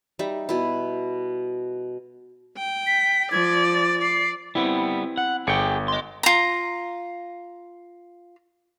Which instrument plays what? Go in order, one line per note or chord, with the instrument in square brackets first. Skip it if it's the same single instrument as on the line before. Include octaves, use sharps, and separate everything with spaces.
[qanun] G3 D#4 E5
B2 E4
[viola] G5
[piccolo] B6
[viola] F3 D5 [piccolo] G#6
[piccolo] A6
[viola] D5 [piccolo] C7
[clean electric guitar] G3 B3 [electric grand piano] C4 E4
[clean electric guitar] F#5
[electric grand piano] G1 C#7 D7 [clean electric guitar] G#4 G5
[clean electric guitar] D#5 C6
[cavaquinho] F4 A#5